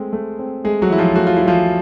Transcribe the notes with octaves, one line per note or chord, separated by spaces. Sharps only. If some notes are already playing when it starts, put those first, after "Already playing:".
Already playing: G#3 A3 C4 G#4
A3
C4
G#3 A3 G#4
F#3 F#4
E3 E4
F3 F4
A3 F#4
F4
E4
E3
F3 F4